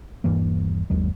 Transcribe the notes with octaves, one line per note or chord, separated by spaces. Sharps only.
D#1 G2 E3 A#3
G1 D#2 F#3 G#3